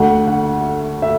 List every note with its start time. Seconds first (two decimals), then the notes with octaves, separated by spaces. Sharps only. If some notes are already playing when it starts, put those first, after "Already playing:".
Already playing: D2 D3 A3 F#5
0.28 F#5
1.02 E5